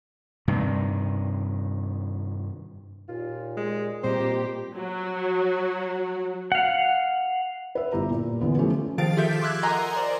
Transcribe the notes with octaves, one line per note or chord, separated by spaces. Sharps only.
G2 C3 D#3
D#2 A#2 F4
G#3
A#2 G3 C4 G4 C5 D#5 A#5
F#3 F#4
F5 F#5
B4 E5
G1 E4 F4 G4 A#5
A#2
D3 E3 B3
F3 A3 C#4 G4 A4
D#3 F3 G#4 F5 A6 D7
F4 G4 A4 E5 G6 B6
C6 D6 E6 F#6 G#6
A#4 D#5 F#5 G#5 A#5 C6
C5 D5